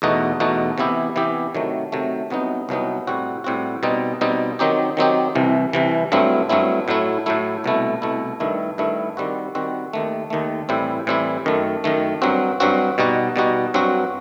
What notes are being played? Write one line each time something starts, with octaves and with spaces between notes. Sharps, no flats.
E2 B2 A3 D#4 F#4
E2 B2 A3 D#4 F#4
C3 E3 B3 E4 G4
C3 E3 B3 E4 G4
C3 D#3 F#3 A3
C3 D#3 F#3 A3
C2 C3 F#3 B3 D#4
C2 C3 F#3 B3 D#4
A2 G3 C4 F#4
A2 G3 C4 F#4
B2 G3 C4 D#4
B2 G3 C4 D#4
D#3 F#3 C4 D#4 G4
D#3 F#3 C4 D#4 G4
C2 C3 E3
C2 C3 E3
G2 F#3 A3 C4 E4
G2 F#3 A3 C4 E4
A2 F#3 A3 E4
A2 F#3 A3 E4
C2 B2 A3 E4
C2 B2 A3 E4
G2 D#3 A3 E4
G2 D#3 A3 E4
D#3 G3 C4 F#4
D#3 G3 C4 F#4
D#2 D#3 A3
D#2 D#3 A3
A2 E3 G3 C4 E4
A2 E3 G3 C4 E4
F#2 D#3 A3
F#2 D#3 A3
G2 F#3 C4 F#4
G2 F#3 C4 F#4
B2 G3 D#4 F#4
B2 G3 D#4 F#4
G2 F#3 C4 F#4